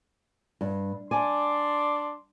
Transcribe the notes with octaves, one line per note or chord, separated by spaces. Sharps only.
G2
D4 D5 G#5 C6